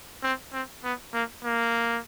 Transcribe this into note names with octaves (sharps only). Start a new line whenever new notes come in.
C4
C4
B3
A#3
A#3